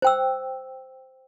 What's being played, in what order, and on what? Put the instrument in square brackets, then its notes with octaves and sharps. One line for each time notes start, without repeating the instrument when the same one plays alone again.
[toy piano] C5 G5 E6